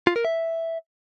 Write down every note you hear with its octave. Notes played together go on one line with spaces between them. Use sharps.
F4
A#4
E5